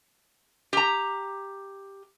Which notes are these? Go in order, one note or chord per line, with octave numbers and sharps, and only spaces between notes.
G4 A#5